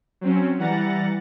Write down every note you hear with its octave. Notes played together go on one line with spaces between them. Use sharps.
F#3 C4 C#4
E3 G3 F#5 A#5 A6 A#6